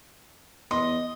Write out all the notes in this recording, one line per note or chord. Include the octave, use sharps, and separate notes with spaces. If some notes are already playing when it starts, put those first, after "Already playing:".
E2 D#5 C6